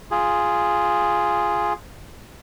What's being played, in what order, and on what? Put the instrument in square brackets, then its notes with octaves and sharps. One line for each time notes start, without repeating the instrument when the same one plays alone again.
[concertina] F4 G#4